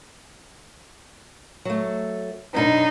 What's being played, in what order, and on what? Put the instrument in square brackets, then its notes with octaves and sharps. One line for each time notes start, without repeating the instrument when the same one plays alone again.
[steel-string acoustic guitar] F#3 A3
[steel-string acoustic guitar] F#2 B2 D4 [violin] D#4